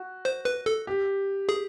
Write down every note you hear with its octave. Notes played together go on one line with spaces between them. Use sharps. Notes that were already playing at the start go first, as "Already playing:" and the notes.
Already playing: F#4
C5
B4
A4
G4
G#4